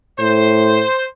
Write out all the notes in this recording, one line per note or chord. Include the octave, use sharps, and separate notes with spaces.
A2 C5